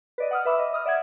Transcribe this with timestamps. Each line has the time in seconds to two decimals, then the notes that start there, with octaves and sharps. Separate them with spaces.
0.18 B4 D5 D#5
0.31 F#5 D#6 F6
0.45 B4 E5 B5 D6 E6
0.59 D#5
0.72 D#5 D#6 F6
0.86 D5 E5 F#5 G#6